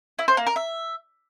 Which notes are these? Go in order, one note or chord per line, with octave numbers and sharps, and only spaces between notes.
E4
C5
A#3
A#4
E5